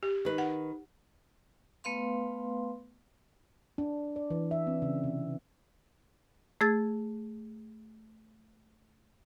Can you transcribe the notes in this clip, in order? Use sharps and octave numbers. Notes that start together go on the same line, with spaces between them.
G4
D#3 B4
F#5
A3 B3 B4 F5 C6
D4
D5
E3
E5
C4
C#3
C3
A3 G#4 E6 G#6 A6